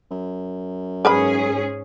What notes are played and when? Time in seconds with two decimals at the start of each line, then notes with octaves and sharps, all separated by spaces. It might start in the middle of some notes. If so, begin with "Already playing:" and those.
0.11 F#2
1.05 G#2 C#4 G#4 A#4 B4 B5